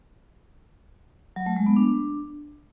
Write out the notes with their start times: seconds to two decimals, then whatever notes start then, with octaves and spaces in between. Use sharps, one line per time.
1.36 F#3
1.46 A3
1.56 G#3
1.66 B3
1.76 D4